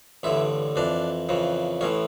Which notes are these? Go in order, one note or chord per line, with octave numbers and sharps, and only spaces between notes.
A1 G2 D3 E4
F2 E3 D4
F2 C#3 E3
A1 A2 E3 C#4